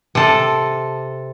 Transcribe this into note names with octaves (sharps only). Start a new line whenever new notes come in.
C3 A4